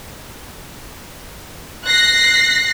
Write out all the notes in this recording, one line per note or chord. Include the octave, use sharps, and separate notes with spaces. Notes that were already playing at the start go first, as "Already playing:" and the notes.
F#6 A#6 C7